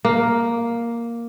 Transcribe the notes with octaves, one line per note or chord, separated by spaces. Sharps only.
A#3